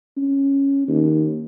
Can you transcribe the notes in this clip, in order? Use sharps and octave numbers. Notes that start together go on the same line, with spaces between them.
C#4
D#2